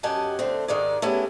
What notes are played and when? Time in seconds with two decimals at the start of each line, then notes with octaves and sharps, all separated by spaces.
0.03 F#2 G4 D#5 F#5 G#5 A5
0.39 D3 A3 C4
0.68 G#2 D#3 G#3 D#4 D5
1.02 A3 B3 C#4 E4 G4 G#4